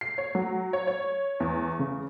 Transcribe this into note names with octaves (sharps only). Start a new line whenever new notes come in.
C7
C#5
F#3
C#5
C#5
E2
C#3